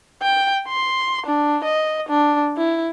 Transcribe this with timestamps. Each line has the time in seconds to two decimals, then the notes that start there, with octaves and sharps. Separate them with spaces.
0.22 G5
0.68 C6
1.26 D4
1.64 D#5
2.09 D4
2.57 E4